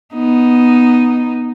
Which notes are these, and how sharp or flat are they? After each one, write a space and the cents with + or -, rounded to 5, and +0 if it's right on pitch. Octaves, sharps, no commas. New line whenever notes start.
B3 +0 D#4 +0